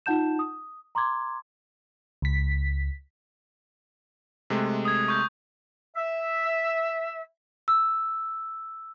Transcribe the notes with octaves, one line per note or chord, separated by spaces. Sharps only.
D#4 F4 F#5 A5 G6 E7
D#6
A#5 C6 D6 G#6
C#2 B6
C3 G#3 A3
D#6 G#6
C#6 G6
E5
E6